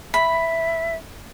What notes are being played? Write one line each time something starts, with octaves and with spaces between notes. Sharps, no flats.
E5 B5